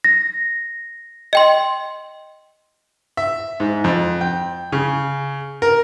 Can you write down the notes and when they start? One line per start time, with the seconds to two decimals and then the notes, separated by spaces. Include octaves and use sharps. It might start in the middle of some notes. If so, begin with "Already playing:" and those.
0.04 A#6
1.33 D#5 G5 C6
3.17 E5
3.60 G#2
3.84 F2
4.21 G5
4.72 C#3
5.62 A#4